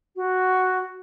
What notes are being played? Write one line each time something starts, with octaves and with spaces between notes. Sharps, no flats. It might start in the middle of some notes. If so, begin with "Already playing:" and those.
F#4